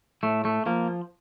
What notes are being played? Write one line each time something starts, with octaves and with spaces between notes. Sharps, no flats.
A2 A3
A3
F3 A#3